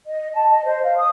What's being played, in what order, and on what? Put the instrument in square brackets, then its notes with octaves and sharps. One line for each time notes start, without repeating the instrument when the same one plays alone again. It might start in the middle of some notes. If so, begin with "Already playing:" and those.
[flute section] D#5
A5
D#5
C5
F5
D#6